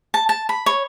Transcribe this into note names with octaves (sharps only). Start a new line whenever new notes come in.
A5
A5
B5
C#5